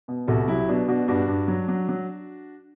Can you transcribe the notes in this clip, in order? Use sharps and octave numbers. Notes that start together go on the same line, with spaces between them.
B2
C2 F#4 A4
F#3 E4 G4
B2 D4 F#4
B2 D4 F#4
G2 D4 F#4
G2
F#3
F#3
F#3